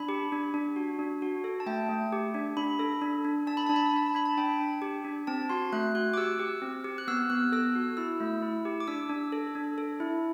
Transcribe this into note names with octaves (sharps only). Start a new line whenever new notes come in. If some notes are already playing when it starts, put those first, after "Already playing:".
Already playing: D4 B5
G4
D4
D4
F#4
D4
F#4
A4
A5
A3 G5
A3
G4
D4
D4 B5
A4
D4
D4
D4 A5
B5
D4 A5
B5
A5
D4 B5
A5
D4 B5
A5
D4 G5
D4
G4
D4
C4 A5
F#4 C6
A3 F#6
F#4 F#6
D6
G4 E6
G4
C4
G4
F#6
B3 E6
B3 F#6
A4 E6
F#4
E4 E6
A3
E4
G4
D6
D4 E6
D4
A4
D4
A4
E4